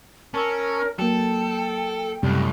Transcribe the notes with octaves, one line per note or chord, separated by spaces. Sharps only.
C#4 A#4 A5 C#6 E6
F#3 A#3 A4 G5
C#2 F#2 A2 C3 G3